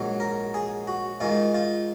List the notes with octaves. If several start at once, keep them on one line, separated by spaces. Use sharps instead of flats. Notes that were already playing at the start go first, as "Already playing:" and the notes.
Already playing: A#1 G#2 F#3
A#4
G#4
F#4
G#2 D#3 G#3 F4
F4